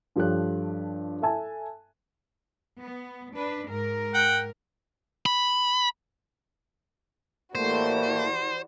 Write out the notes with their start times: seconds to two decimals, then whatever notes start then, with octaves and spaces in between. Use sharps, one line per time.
0.16 G2 F3 G4 A4 C#5 F#6
1.22 A4 E5 G#5 A5
2.80 B3
3.35 D4 B4
3.69 G#2 A#4
4.14 F#5 G5
5.26 B5
7.55 A2 E3 G3 A3 A#3 F#4 C5